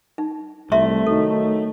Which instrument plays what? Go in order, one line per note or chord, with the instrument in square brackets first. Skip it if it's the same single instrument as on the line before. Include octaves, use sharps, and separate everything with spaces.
[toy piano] D#4
[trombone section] C2 [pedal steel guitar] A3 [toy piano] E5 A#5 C6
[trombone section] D#3 F#3 D#4 [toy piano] A4